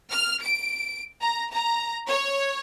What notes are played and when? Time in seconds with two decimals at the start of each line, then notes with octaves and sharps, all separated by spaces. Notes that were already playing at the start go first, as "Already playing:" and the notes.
0.12 F6
0.43 D7
1.21 A#5
1.53 A#5
2.08 C#5